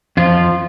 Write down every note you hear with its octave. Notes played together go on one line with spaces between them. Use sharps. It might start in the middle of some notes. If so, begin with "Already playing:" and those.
F2 F3 F4